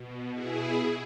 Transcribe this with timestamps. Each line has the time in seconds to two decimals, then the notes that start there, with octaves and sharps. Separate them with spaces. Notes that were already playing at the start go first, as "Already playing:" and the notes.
Already playing: B2
0.33 E4 G#4